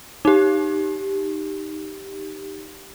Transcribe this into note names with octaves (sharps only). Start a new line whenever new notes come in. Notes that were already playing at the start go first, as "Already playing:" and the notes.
D#4 G4